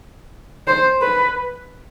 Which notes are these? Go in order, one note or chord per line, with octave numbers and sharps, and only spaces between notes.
C5
B4